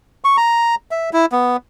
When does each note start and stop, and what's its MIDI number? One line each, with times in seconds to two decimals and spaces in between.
0.24 0.37 85
0.37 0.75 82
0.91 1.10 76
1.13 1.26 64
1.32 1.57 59